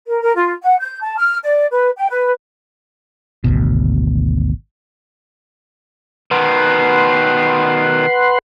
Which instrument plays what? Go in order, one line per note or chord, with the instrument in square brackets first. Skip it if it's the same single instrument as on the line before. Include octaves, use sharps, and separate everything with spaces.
[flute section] A#4
A#4
F4
F#5
G6
A5
F6
D5
B4
G5
B4
[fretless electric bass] G#1 D2 B2
[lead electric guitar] B2 D#3 [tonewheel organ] B4 F#5 C6